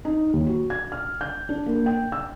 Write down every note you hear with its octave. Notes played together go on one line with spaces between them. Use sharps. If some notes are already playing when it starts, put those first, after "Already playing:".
D#4
D#2
F#4
G#6
F6
G6
D4
A#3
G5
E6